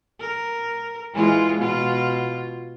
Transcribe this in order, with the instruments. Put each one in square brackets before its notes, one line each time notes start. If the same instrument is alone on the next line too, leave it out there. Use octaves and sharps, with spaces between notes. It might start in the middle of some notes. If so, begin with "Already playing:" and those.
[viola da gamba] A#4
E3 G#3 F4
B2 F4